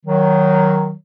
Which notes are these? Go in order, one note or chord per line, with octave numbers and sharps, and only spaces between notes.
D#3 F#3